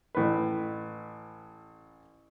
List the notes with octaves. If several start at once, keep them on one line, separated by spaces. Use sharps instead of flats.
A1 A2 B4